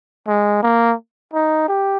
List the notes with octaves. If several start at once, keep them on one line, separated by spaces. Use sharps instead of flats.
G#3
A#3
D#4
G4